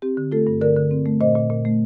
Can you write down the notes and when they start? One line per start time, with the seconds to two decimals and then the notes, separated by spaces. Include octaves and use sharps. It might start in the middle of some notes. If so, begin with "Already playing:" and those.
0.02 C4 G4
0.17 D3
0.32 A3 F4 A4
0.47 G2
0.61 D3 A#4 D5
0.76 D3
0.91 C4
1.06 A3
1.21 A#2 C5 D#5
1.35 A#2
1.50 A#2
1.65 A3